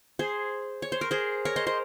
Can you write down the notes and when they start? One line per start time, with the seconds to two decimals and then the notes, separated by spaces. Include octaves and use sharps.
0.19 G#4 C5
0.82 C#5
0.92 C5
1.01 A#4
1.11 G#4 C5
1.45 A#4 C#5
1.56 C5 D#5
1.67 C5 D#5